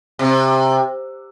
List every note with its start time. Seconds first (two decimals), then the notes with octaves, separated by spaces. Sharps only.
0.19 C3